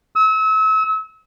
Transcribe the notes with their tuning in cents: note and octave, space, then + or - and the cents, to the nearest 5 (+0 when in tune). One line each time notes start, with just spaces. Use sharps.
E6 -35